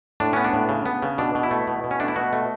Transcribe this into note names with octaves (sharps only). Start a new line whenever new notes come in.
A2 D4
B3 C#4
D4
A2
C#3
B3
C#3
B2 D4
B2
E4
A3
B2
B2
C#4
A3 D4
E4
B2 F#4
A3